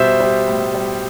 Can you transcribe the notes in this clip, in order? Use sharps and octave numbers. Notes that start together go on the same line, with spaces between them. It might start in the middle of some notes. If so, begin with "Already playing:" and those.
Already playing: B2 G3 C5 E5
G3
A2
G3